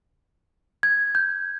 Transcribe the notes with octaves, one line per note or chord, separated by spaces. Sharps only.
G#6
G6